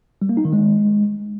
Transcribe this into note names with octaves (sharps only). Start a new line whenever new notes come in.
G3
A#3
D#4
D#3
G#3